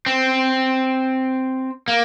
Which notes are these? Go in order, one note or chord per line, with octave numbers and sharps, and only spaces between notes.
C4
A#3